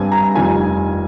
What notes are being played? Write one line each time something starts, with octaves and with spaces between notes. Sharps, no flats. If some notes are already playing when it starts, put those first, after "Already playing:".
Already playing: G2 G3 C4 G#5
A#5
F1 F2 D#3 G3 G#5